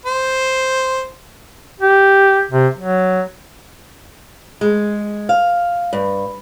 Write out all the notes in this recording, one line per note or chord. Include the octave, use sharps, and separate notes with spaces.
C5
G4
C3
F#3
G#3
F5
G2